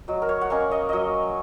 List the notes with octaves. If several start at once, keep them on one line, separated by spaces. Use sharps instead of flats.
F#3 D#5
A#4
C#5
F#5
A#3 C#4 D#5
D#5
F#3 C#5 D#5